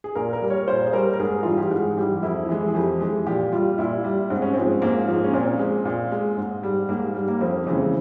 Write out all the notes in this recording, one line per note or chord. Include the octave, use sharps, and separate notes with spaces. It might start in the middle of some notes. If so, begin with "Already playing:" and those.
G#4
A#2 A#4
A#4
G3
C#5
A#2 C5
G#4
G3 A#4
A#4
G#2 G#4
E3 G3 F4
G4
G#2 G#4
E3 G3 G4
F2 E4
E3 G#3
G#4
F2 G4
E3 G#3
A#2 G4
G3 F4
A#2 E4
G3
G#2 C4
C#4
F3 G#3 C4
G#2 A#3
F3 G#3
C#4
A#2 C4
G#3
A#2
G#3
G#2
G3
G#2 A#3
G3
A#3
F2 C4
C#3 E3 G#3 C4